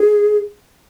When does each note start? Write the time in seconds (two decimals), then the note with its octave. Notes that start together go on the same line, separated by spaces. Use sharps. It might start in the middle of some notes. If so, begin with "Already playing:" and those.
Already playing: G#4